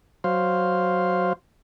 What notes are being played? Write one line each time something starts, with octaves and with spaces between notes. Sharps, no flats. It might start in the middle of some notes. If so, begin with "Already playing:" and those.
F#3 C5 F5